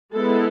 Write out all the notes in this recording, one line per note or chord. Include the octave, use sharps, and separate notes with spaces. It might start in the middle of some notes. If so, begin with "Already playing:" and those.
G#3 B3 E4 A4